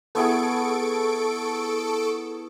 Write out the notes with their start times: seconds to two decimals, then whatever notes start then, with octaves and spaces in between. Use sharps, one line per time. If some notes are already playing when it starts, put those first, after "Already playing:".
0.15 B3 E4 G#4 A4 C#6 D7